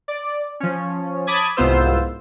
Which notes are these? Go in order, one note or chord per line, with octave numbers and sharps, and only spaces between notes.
D5
F3 C#4
A5 B5 D6 D#6 G#6
C2 G#2 B3 F4 C5 E6